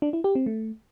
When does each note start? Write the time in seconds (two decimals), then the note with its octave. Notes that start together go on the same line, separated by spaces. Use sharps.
0.02 D4
0.13 E4
0.24 G4
0.35 C4
0.46 A3